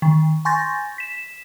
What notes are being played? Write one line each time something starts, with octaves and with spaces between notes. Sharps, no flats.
D#3
G#5 C6 C#6 G6 A6 A#6
B6 E7